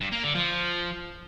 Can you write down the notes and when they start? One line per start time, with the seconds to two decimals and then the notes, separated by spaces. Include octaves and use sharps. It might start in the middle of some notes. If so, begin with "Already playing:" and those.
0.01 G2
0.12 A#3
0.24 D3
0.35 F3